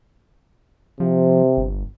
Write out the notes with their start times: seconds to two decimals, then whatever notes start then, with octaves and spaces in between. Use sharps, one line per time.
1.00 C3 F3
1.57 G1